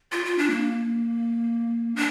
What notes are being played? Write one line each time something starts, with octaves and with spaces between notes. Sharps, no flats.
F4
F4
D4
A#3
D4